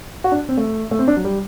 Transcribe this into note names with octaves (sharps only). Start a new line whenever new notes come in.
F#4
D4
C4
A3
A3
C4
D4
F#3
G3